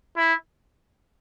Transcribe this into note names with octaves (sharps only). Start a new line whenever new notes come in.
E4